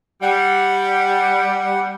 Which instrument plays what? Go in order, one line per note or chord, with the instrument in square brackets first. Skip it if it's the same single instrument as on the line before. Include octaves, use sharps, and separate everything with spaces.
[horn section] G3 [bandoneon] F#5